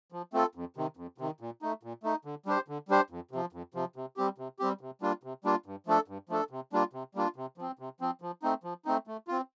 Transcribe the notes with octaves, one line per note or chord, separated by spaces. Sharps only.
F3
A3 C4 F4 A4
F2
C3 D#3
F2
C3 D#3
A#2
A3 D#4
A#2
A3 D#4
D3
G3 D4 G4 C5
D3
G3 D4 G4 C5
F2
C3 F3
F2
C3 F3
C3
G3 C4 G4
C3
G3 C4 G4
C3
G3 A#3 D4 F4
C3
G3 A#3 D4 F4
G2
F3 A3 D4 A4
G2
F3 A3 D4 A4
C3
G3 A#3 D4 F4
C3
G3 A#3 D4 F4
C3
F3 C4
C3
F3 C4
F3
A3 C4 D#4
F3
A3 C4 D#4
A3
C4 F4